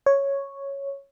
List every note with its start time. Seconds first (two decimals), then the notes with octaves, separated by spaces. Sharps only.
0.06 C#5